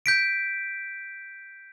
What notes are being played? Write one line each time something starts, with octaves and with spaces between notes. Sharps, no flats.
G6 B6 D7